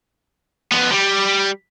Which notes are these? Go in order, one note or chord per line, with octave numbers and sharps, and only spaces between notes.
F3 B3
G3